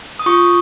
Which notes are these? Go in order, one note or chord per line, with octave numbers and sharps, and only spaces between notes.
D#6
F4 C#6